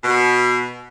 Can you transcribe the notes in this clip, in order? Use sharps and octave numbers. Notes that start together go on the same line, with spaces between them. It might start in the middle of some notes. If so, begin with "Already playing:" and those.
B2